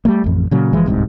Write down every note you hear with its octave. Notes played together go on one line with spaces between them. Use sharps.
G3 A3 A#3
A1 F2
A#2 C#3 F#3
F#1 E3 F3 G#3
D1 C2 G#2 C3